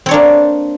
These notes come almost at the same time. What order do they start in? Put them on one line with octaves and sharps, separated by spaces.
C4 C#5 D4 A#3